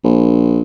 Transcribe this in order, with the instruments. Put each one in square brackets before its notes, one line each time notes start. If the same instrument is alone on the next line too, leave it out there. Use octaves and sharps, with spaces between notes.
[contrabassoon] A#1